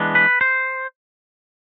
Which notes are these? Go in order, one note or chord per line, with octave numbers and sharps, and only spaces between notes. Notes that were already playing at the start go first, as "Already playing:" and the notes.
Already playing: E3 G#3 B3 D4
B4
C5